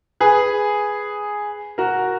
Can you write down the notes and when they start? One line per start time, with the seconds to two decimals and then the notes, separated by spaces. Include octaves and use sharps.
0.20 G#4 B4
1.78 F#4 A#4